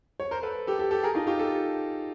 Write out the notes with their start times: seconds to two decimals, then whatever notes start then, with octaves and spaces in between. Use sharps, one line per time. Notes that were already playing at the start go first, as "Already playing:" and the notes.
0.20 C#5
0.31 A#4 C5
0.43 A4 B4
0.67 G4 A4
0.79 G4 A4
0.91 G4 A4
1.03 G#4 A#4
1.15 D#4 F4
1.27 F4 G4
1.39 G4 A4